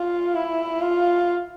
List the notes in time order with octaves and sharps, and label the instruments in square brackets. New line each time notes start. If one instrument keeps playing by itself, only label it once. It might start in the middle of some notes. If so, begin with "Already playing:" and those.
Already playing: [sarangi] F4
E4
F4